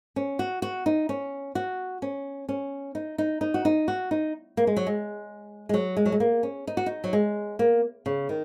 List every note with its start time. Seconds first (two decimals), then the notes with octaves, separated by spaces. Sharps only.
0.16 C#4
0.39 F#4
0.62 F#4
0.86 D#4
1.09 C#4
1.55 F#4
2.02 C#4
2.49 C#4
2.95 D#4
3.18 D#4
3.41 D#4
3.54 F#4
3.65 D#4
3.88 F#4
4.11 D#4
4.57 A#3
4.67 G#3
4.77 F#3
4.87 G#3
5.69 G#3
5.74 F#3
5.97 G#3
6.06 F#3
6.12 G#3
6.20 A#3
6.43 C#4
6.67 D#4
6.77 F#4
6.86 D#4
7.04 F#3
7.13 G#3
7.59 A#3
8.06 C#3
8.29 D#3